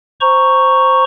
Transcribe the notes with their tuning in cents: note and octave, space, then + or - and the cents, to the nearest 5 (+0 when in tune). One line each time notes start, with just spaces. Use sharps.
C5 +0 A#5 +0 C#6 +0